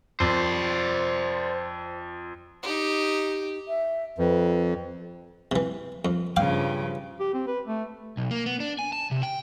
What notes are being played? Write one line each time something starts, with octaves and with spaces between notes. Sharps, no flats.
F2 C5 D5
D#4 G4
E5
F2 B4
C3 E3
F2
G2 C#3 F3 F5 G5 D6
G4
C4
B4
A3
B1
A#3
B3
D4
G#5
A5
C3
G5